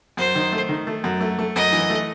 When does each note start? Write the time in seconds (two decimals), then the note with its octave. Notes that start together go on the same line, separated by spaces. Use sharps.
0.17 F#2 C5
0.35 D#3
0.52 A3
0.69 D#3
0.87 A3
1.04 F#2
1.21 A3
1.39 A3
1.55 F#2 D#5
1.72 E3
1.90 A3